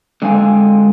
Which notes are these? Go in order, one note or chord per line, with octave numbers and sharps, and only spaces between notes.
D3 G#3 C4 F5 G#5